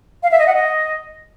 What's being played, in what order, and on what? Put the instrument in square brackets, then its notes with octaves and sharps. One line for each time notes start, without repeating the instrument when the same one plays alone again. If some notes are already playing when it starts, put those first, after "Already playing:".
[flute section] F5
E5
D#5
F#5
D#5